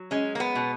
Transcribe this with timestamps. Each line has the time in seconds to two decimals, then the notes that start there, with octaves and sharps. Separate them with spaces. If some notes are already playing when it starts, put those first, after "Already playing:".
Already playing: F#3
0.11 G#3 C#4
0.35 A#3
0.40 B3
0.55 B2